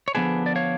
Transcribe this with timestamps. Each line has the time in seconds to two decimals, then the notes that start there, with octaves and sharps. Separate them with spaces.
0.08 C#5
0.15 D3 F3 B3 D4 G#4 B4
0.46 D5
0.56 C#5 F5